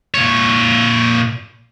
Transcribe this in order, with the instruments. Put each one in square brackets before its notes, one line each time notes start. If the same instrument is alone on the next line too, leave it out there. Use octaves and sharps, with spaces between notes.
[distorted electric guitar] A#2 C#5